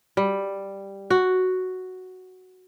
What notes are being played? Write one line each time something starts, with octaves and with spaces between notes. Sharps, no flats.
G3
F#4